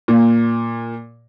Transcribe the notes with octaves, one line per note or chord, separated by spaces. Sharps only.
A#2